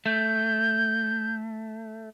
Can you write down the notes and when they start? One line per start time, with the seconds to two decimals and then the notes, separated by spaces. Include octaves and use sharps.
0.06 A3 G6